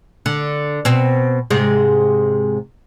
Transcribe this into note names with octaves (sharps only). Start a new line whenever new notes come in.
D3
B2 C4
G#2 C3 G#3